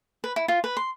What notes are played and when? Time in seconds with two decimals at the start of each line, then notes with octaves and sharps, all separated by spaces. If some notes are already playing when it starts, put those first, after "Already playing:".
0.24 B4
0.36 E4
0.48 F4
0.64 B4
0.77 C6